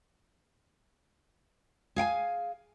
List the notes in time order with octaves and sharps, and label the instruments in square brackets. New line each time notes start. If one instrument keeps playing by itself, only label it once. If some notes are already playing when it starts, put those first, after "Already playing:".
[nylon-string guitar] G#4 F5 G5 G#5